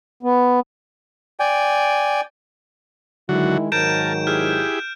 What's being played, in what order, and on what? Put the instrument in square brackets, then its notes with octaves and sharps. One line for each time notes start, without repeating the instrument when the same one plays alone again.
[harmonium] B3
[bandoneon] D5 G5 G#5
[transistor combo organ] D3 F#3 F#4 [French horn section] D#3 G#3 E4
[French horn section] G#2 D#3 F#3 [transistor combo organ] A#4 A5 [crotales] G6 D7 E7
[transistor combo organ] E4 G4 G#4 [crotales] F6